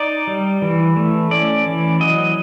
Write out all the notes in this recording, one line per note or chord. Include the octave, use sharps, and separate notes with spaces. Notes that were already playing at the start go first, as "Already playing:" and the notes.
Already playing: D#4 D5
G3
E3
A3
C#4 D5
E3
F#3 D#5